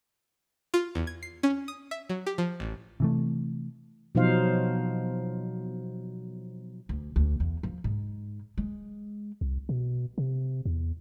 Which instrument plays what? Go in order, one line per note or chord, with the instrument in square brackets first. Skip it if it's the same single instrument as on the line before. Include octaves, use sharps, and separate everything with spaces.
[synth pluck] F4
E2
G#6
C7
C#4
D#6
E5
F#3
G4
F3
A1
[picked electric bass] C3 E3 A3
[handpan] B2 F3 F#3 D#4 C5 F5
[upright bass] D2
D2
E2
F3
G#2
G#3
[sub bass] C2
B2
C3
E2